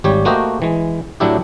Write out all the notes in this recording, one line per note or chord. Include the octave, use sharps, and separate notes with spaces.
G#1 G3 G4 C#5
A3 A#3 F#4 G4 C5 D#5
E3 G#3
A2 F#3 D4 E4 G4